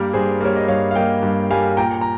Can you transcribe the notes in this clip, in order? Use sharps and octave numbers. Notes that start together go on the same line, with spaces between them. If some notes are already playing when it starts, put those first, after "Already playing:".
Already playing: G2 G3 A#3 A#4
G2 G#4 C5
G3 A#3 C#5
D#5
G2 C#5 F5
F5
G3 A#3 D#5 G5
G2
G3 A#3 F5 G#5
A#2 G5 A#5
A#5